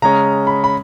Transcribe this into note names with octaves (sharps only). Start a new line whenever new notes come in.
C#3 G#3 C#4 A#5
B5
B5